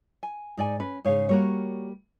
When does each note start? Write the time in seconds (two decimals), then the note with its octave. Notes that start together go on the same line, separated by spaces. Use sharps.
0.23 G#5
0.57 G#2 D#4 D5 G#5
0.80 C#4 B4
1.05 G#2 C#3 D#4 C#5 F5
1.29 G3 A#3 F#4 A#4 C#5